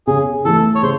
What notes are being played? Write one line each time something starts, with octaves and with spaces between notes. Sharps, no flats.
C#3 G#4
E3 A3 A4
C#5
C#3 C5